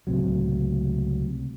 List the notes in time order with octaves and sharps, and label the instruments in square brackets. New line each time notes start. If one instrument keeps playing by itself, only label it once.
[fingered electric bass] C#2 A2 C3 F#3